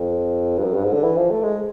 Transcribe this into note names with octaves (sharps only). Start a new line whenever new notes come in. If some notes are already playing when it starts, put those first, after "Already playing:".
Already playing: F2
G2
F#2
G2
G#2
D3
E3
F3
A3
G#3